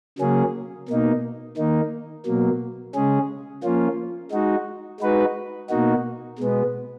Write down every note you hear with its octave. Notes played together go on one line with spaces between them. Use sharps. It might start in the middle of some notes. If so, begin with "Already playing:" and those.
C#3 F#3 A#3 C#4 G#4
B2 A#3 D#4
D#3 A#3 D#4
B2 F#3 A#3
C#3 G#3 C#4 G#4
F3 A#3 C#4 F4
G#3 D#4 F#4
G#3 D#4 F#4 B4
B2 A#3 D#4 F#4
B2 G#3 B3